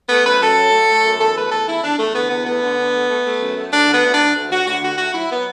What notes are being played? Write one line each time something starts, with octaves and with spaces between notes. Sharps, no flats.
A3 B3
F#2 B4
F#2 A4
F#3
A3
A3
F#2
E2 A4
A3 B4
E2 A4
E2 E4
E2 D4
E2 A3
D3 B3
E2 B3
A3 B3
D3
D3
A3
A3
A3
F#2
A3
D2 D4
D3
B3
D2
D4
D2
D2
D2 F#4
D2 F#4
D3 F#4
A3 F#4
F#3 E4
F#3 B3